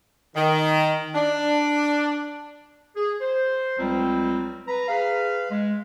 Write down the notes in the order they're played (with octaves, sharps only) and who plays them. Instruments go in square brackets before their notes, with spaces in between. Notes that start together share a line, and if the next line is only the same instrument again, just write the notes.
[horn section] D#3
D4
[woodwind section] G#4
C5
C#2 F#3 G3 C4
B4 A#5
G#4 B4 F5
G#3